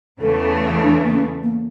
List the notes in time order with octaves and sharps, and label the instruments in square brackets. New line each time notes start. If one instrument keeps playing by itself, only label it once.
[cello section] E2 C#3 E3 A3 [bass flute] A4
[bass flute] D4
A#3
C#4
A#3